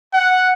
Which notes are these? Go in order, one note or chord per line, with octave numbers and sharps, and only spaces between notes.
F#5